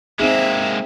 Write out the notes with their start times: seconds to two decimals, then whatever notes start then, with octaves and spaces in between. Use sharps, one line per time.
0.20 G#3 A#3 C4 D#4 G#4 E5